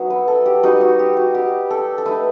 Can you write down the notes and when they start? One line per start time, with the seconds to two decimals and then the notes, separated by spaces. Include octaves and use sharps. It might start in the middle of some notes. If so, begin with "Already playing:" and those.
Already playing: F#3 B3 D#4 E5 F#5
0.10 B4
0.28 A4
0.46 G4
0.63 G3 D#4 F#4
0.81 F#4
0.99 G4
1.17 F#4
1.34 G4
1.70 A4
1.98 A4
2.05 A3 D#4 B4